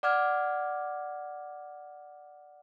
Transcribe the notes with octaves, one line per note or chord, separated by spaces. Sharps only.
D5 F#5 D6 F6 G#6